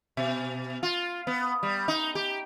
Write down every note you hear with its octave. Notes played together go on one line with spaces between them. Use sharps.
B2
F4
B3
G3
D#4
G4